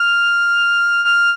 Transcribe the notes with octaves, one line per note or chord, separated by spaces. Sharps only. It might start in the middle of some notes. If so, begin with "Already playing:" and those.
Already playing: F6
F6